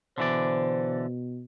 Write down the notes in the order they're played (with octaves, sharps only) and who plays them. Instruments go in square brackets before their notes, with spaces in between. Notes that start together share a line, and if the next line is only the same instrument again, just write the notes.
[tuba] B2 [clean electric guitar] D3 E3 D5 [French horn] C5